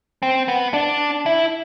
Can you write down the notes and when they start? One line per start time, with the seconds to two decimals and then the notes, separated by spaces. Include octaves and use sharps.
0.23 C4
0.48 B3
0.74 D4
1.26 E4